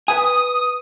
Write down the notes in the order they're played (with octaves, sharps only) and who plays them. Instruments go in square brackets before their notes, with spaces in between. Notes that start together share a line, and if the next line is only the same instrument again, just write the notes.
[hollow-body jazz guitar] B4 G#5 [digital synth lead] D#6